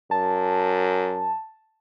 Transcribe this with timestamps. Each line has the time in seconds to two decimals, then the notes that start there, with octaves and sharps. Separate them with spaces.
0.11 F#2 A5